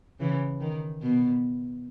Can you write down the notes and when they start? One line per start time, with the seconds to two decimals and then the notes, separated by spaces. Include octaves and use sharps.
0.20 C#3 E3
0.60 D#3
1.02 B2